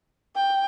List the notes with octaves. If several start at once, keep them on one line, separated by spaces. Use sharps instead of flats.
G5